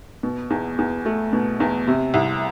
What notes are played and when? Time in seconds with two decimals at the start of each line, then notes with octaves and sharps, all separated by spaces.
0.23 B2
0.50 E2
0.79 E2
1.05 A3
1.33 B2
1.60 E2
1.87 C3
2.14 C2